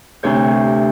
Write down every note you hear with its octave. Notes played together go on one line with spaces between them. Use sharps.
D2 C3 C#5 G6